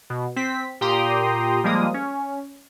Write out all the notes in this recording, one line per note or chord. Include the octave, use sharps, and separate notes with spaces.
B2
C4 B6
A#2 G4 G5 A#5 C6 D#6
F3 G3 G#3 A#3 D#6
C#4